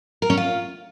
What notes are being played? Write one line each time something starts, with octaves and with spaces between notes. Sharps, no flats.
A#4
C#4
F4